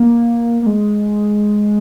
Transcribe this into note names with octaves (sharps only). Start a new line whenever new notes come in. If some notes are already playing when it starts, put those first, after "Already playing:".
Already playing: A#3
A#3
G#3